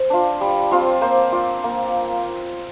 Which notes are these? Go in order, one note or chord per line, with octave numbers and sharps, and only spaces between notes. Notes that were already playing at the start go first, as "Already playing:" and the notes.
Already playing: C5
D4 F4
G3
C4 F4
A#3 C5
F4 D5
A#3